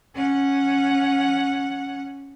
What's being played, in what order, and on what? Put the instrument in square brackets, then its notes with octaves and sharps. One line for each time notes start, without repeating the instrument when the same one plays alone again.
[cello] C#4 F#5